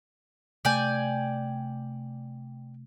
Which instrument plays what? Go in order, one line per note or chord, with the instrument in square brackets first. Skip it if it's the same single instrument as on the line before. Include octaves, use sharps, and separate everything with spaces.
[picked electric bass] C3 A3 [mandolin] D5 G5 G#5